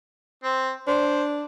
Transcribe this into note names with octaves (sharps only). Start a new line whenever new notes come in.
C4
D4 C5